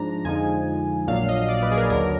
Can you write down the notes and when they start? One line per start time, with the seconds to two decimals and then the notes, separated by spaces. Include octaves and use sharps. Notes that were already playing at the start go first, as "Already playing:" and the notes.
Already playing: G#2 F3 G#3 D4 A#5
0.24 F2 D3 F3 G#3 D#4 G#5
1.07 A#1 A#2 F#3 D4 F5
1.28 D#5
1.48 D5
1.62 B4
1.71 G#4
1.77 A#4
1.90 D#2 D3 F#3 D4 A#4